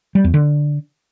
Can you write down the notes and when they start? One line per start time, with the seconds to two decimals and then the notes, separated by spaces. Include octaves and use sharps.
0.15 G3
0.24 E2
0.34 D3